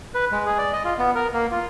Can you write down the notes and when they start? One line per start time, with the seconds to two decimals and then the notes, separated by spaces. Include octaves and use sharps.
0.14 B4
0.32 G#3
0.46 G#4
0.58 D5
0.73 D#5
0.85 F4
0.99 B3
1.15 A#4
1.33 A#3
1.51 F4